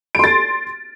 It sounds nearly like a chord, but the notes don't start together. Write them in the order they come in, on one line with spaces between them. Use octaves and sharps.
D7 C6 A6